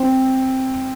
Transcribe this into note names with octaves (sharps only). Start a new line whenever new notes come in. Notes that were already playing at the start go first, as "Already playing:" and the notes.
Already playing: C4